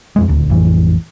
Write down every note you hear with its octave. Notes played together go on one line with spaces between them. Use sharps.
F2 A2 G#3
D#1 D2
A1 F2 A2 E3